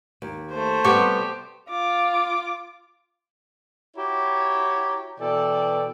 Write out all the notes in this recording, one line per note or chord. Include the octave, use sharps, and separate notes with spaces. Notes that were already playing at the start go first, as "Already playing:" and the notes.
D#2
A3 C5
C3 G3 B3 G4 C#6
F4 D6
E4 F#4 G4 C#5 A#5
B2 E3 A4 D5 G5